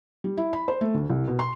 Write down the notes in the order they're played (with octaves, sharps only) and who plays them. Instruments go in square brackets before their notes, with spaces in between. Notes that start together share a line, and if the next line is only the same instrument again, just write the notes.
[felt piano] G3
E4
B5
C5
A3
D2
C2
B2
C6